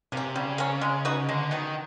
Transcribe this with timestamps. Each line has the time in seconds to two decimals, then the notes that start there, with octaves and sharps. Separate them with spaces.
0.12 C3 A#3 C#4
0.35 C#3 G3
0.58 A#3 C#4
0.81 G#3
1.05 B3 D#4 F#4
1.28 D3 G#3
1.51 D#3 B3 D#4 F#4